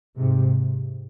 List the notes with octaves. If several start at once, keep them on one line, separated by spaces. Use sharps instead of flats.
G#2 C3